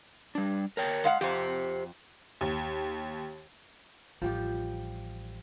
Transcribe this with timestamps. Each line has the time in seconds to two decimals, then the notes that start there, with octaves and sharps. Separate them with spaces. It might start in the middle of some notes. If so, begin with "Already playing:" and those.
0.35 G3 D4
0.77 A#4 C#5 G5
1.04 G#3 F5 F#5
1.21 F2 G4 C5
2.41 D#2
4.22 A1 F3 G3 G4